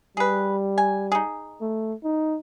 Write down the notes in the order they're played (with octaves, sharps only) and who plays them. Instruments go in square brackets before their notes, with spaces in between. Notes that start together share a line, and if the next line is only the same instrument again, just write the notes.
[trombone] G3 [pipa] G#4 B4
[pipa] G#5
D#4 G#4
[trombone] A3
D#4